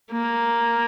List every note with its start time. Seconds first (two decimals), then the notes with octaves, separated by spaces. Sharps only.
0.12 A#3